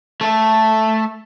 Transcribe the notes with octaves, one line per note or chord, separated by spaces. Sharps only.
A3 A4